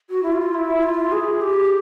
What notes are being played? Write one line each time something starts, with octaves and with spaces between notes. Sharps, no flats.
F#4
E4
F4
E4
F4
G#4
G4